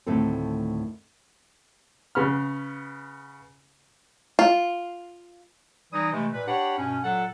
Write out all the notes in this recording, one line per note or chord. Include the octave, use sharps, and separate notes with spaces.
D2 A2 D#3 C4 A4
C#3 B3 B5 F6
F4
E3 G3 D#4 D#6
C3 E3 G#3 A3
A#2 B4
D4 G4 C#5 F#5 B5
G2 B2 C#4
A#2 F#3 A4 F#5